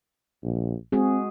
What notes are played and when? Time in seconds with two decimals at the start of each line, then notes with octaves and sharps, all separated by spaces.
0.43 A#1
0.92 G#3 C4 F#4 G#4